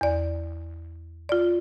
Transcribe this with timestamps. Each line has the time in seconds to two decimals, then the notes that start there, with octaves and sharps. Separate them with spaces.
0.01 E2 D5
1.29 F4 D5